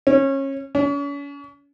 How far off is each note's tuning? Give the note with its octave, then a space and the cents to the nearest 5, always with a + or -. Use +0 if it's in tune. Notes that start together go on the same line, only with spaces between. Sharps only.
C#4 -25
C#4 +40